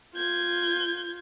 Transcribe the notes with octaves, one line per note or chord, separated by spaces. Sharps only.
F4 G6 G#6